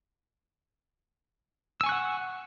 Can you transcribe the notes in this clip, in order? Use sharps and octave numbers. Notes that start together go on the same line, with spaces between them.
F#5 G#5 C#6 E6 F#6